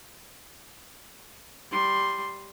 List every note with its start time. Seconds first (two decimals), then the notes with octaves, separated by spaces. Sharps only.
1.71 G3 C6